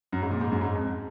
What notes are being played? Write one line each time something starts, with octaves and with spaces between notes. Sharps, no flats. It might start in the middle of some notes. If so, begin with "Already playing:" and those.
F#2
G#2
A#2
G#2
F#2
G#2
F2